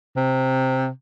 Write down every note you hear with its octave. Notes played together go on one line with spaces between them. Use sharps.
C3